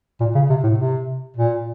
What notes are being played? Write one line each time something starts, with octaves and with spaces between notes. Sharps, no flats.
A#2
C#3
C3
A2
C3
A#2